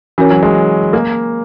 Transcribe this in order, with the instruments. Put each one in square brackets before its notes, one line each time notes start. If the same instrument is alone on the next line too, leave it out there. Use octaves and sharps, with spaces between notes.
[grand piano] E3 [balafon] C#4 F#4 A#4 C#5
[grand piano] F#3
G#3
A#3